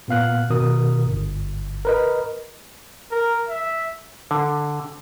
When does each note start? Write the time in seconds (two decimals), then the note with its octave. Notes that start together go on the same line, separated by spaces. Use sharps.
0.08 A#2 B3 F5 F#6
0.50 B2 D#3 A#4 D#6
1.06 G1
1.85 A#4 B4 D#5
3.11 A#4
3.49 E5
4.31 D3